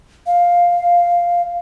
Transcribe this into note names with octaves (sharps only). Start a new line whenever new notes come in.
F5